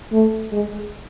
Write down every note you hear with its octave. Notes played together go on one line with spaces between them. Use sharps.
A3
G#3